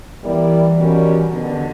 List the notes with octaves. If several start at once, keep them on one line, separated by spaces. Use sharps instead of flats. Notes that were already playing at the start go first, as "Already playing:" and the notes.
E3 G3 B3 E4 A#4 D5
B2 G3 C#4 F#4 A#4
B2 D3 G3 B3 D4